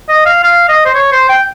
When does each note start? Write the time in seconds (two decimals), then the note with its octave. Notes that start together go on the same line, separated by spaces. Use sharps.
0.09 D#5
0.26 F5
0.43 F5
0.69 D#5
0.86 C5
0.94 C#5
1.12 C5
1.29 G5